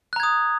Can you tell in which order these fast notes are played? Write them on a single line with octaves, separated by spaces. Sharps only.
F#6 A#5 G#6 D#6